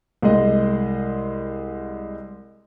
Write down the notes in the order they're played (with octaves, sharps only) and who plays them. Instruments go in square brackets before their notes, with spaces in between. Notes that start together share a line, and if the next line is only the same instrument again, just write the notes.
[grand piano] C2 G#3 D#5